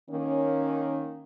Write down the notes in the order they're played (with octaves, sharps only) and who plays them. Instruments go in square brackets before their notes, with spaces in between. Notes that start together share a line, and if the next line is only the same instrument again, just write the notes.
[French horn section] D#3 A#3 C#4